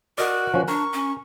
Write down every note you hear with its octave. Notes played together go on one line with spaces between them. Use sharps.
F#4 A#4 D5 D#5
F3 C#4
D4 A#4 C#6
C#4